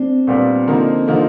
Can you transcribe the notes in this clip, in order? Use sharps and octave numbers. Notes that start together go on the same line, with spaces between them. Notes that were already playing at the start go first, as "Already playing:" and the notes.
Already playing: C4 D4
A#2 G3 B3 D4
D3 F3 A#3 D#4
D3 F3 A#3 D#4